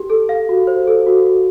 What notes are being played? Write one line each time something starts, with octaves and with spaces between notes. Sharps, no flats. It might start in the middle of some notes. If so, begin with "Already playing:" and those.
Already playing: G4
A4
F5
F#4
C5
A4
F#4
F#4